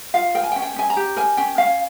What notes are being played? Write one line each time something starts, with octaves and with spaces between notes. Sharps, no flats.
F4 F5
A#4 G5
G#5
G5
C#4
G5
C#4 G#5
A#5
G4
A#4 G#5
C#4 G5
C#4 F5